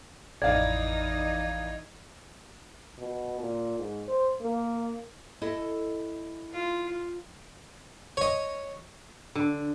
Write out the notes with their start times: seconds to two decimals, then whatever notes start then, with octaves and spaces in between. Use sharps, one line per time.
0.42 A1 F2 E3 D#4 D5 F5 G#6
2.98 B2
3.40 A#2
3.79 G#2
4.08 C5
4.41 A#3
5.42 E4 A4 D#5
6.53 F4
8.17 C#5 D#5
9.35 D3